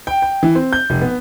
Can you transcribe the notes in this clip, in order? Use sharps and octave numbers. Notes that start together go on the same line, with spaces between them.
G5
G5
E3
C4
G6
F1
B3